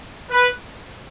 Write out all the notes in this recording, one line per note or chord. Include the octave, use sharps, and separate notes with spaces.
B4